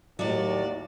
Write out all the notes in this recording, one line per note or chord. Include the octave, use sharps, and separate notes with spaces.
D#2 A2 F#3 D5